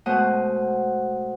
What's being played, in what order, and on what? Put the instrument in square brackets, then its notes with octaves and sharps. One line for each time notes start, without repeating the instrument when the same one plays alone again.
[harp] B2 G#3 A3 C5 F#5 D#6